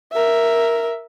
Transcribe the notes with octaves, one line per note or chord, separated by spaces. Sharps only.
A#4 E5